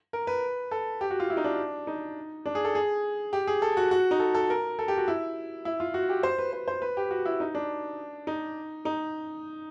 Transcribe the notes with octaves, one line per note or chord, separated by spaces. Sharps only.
A#4
B4
A4
G4
F#4
F4
E4
D#4
D4
D#4
D4
G#4
A4
G#4
G4
G#4
A4
F#4
F#4
D#4
A4
A4
A#4
A4
G4
F#4
E4
E4
F4
F#4
G4
C5
B4
C5
C5
B4
G4
F#4
E4
D#4
D4
D#4
D#4